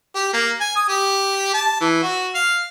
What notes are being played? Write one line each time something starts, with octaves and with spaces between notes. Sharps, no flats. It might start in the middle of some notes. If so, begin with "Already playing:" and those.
G4
A#3
G#5
D#6
G4
A5
E3
F#4
F5